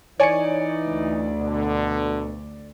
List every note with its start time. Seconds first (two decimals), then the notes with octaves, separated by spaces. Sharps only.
0.20 E3 D#4 C#5 D5 G#5 C#7
0.86 D2
1.38 B2 D3